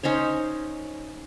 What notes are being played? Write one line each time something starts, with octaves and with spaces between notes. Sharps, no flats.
C#4 D#4 C5 C#5